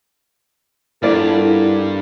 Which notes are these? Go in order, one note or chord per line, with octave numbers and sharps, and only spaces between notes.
G2 A#3 B3 E4 F4 A4 D5